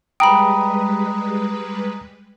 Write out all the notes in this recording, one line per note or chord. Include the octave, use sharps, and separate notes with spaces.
G3 G#3 B4 G5 A#5 B5 D#6